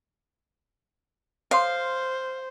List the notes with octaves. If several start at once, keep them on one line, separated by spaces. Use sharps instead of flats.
A4 C5 C#5 F5 C6